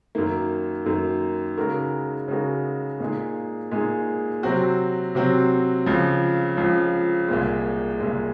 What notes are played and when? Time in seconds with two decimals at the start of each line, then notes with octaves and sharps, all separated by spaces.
0.15 F#2 D#3 A#3
0.86 F#2 D#3 A#3
1.58 C#3 G#3 D#4 F#4 A#4
2.28 C#3 G#3 D#4 F#4 A#4
3.00 A#2 G#3 D#4 G#4
3.71 A#2 G#3 D#4 G#4
4.43 C3 F#3 C4 F#4
5.15 C3 F#3 C4 F#4
5.86 C#2 C#3 F3
6.57 C#2 C#3 F3
7.28 C2 A#2 G#3
8.00 C2 A#2 G#3